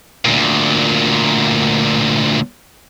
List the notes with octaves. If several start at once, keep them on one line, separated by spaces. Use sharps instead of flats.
D2 A#2